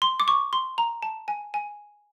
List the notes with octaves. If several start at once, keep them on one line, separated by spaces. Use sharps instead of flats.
C6
D6
C#6
C6
A#5
A5
G#5
G#5